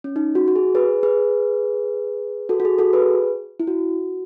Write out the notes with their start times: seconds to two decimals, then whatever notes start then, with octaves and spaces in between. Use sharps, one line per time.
0.04 C#4
0.16 D#4
0.35 F#4
0.48 F#4
0.56 G#4
0.75 G#4 B4
1.03 G#4 B4
2.49 F#4 A4
2.60 F#4
2.65 G#4
2.79 F#4 A4
2.93 G#4 B4
3.60 E4
3.67 F#4